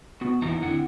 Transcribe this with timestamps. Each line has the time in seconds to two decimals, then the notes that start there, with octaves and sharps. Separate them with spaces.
0.21 B3 F#4
0.42 E2 A#3 D#4 E4 A#5
0.62 D3 C4 E4 F#5